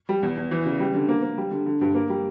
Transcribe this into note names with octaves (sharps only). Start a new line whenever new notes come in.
G3
E2
E2
E3
C#3
G3
D3
A#3
A#3
G3
D3
D3
G2
A#3
G3